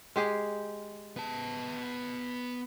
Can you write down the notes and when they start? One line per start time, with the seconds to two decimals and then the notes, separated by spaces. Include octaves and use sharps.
0.16 G#3 G4 G#4
1.16 B3 A5